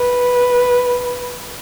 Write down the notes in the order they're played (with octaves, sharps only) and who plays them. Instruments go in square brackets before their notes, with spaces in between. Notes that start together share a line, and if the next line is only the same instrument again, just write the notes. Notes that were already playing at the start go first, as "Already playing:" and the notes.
Already playing: [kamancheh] B4